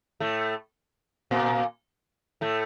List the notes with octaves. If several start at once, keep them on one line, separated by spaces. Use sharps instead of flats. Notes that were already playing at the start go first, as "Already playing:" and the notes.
A2 A3
A#2 A#3
A2 A3